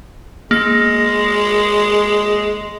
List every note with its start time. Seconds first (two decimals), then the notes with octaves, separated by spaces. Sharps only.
0.51 G#3 A#3 A#6